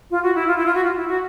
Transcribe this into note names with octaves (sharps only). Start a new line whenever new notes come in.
F4
F#4
E4
F4
E4
F4
F#4
F4
E4
F#4